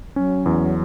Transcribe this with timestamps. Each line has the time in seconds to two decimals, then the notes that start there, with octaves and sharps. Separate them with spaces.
0.16 F#3 C#4
0.46 E2